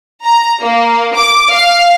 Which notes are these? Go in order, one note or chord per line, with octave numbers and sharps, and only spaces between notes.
A#5
A#3
D6
F5